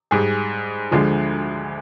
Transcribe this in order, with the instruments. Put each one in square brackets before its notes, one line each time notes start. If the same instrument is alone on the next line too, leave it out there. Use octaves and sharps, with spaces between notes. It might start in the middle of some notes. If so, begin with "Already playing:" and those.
[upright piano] G#2 G3 G#4
D2 D3 F3 G#3